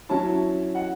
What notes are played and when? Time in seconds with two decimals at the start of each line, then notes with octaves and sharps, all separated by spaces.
0.09 F#3 C#4 E4 A5
0.75 F#5